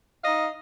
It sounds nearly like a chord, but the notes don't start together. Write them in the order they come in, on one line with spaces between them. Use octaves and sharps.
F5 D#5 D#4